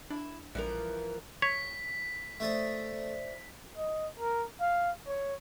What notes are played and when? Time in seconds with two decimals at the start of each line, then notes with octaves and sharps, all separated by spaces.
0.10 D4 E4
0.55 A#1 E3 F3 G3 A#4
1.42 C#5 B6
2.40 A3 A4 C5 D5 E5 D#6
3.77 D#5
4.20 A#4
4.60 F5
5.07 C#5